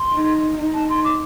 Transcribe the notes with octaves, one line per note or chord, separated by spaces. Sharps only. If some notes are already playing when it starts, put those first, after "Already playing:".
Already playing: C6
D#4
D#4
A5
C6
D6